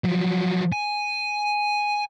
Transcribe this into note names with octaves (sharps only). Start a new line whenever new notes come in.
F3 F#3
G#5